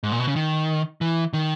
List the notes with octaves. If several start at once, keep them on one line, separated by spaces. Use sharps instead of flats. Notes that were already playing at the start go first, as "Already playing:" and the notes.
G#2
A#2
B2
C#3
D#3
E3
D#3